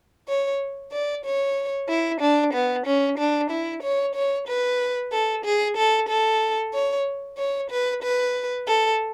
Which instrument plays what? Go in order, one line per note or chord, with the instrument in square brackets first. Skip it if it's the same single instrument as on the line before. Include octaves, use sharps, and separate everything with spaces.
[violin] C#5
D5
C#5
E4
D4
B3
C#4
D4
E4
C#5
C#5
B4
A4
G#4
A4
A4
C#5
C#5
B4
B4
A4